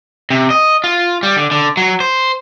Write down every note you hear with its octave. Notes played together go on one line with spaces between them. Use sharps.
C3
D#5
F4
G3
D3
D3
F#3
C5